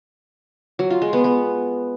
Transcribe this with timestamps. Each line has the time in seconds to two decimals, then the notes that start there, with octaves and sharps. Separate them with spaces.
0.79 F#3
0.90 F4
1.02 G#3
1.13 B3
1.24 B3